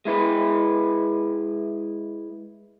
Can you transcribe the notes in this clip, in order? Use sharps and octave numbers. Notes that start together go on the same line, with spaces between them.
G#3 E4 B4